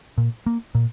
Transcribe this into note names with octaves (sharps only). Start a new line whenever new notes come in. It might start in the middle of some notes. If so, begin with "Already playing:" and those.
A#2
A#3
A#2